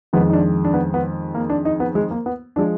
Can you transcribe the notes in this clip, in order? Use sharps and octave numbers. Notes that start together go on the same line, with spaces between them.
F2 D#3 G#3 B3
D#4
D4
D4
B3
B3
A#3
D4
D#4
B3
G#3
A#3
B3
F3 G#3 D4